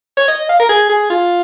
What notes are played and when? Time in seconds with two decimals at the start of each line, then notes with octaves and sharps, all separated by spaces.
0.17 C#5
0.28 D#5
0.49 F5
0.60 A#4
0.69 G#4
0.89 G#4
1.10 F4